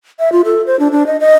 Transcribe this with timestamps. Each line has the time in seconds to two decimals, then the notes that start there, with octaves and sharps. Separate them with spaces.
0.19 E5
0.32 F4
0.45 A4
0.66 C5
0.79 D4
0.92 D4
1.06 D#5
1.20 D#5